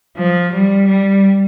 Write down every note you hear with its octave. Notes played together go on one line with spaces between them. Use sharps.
F3
G3
G3